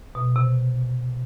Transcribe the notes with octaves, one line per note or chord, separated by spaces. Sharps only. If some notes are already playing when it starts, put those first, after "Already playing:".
B2
C3